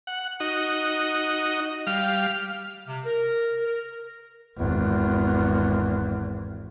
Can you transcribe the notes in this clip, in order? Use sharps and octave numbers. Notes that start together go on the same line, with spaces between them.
F#5
D#4 F#4 D#5
G3 F5 F6
C3
A#4
A#4
G#1 E2